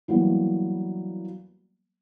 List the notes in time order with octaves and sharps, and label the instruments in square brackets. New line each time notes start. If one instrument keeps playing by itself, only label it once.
[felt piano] E3 F#3 G3 A#3 B3